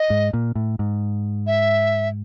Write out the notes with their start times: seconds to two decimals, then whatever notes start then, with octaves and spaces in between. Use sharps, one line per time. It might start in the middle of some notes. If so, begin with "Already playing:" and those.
Already playing: D#5
0.10 G#2
0.33 A#2
0.55 A2
0.79 G#2
1.47 E5